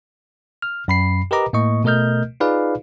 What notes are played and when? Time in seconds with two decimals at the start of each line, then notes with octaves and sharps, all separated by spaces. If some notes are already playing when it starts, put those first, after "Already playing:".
0.62 F6
0.88 F#2 B5 C7
1.31 G4 A#4 B4 D#5 A#5 D6
1.53 A2 A#3 D#5 C#6
1.84 B2 A3 A#4 D#5 F6 G6
2.40 D#4 F4 G#4 B4 D5 F5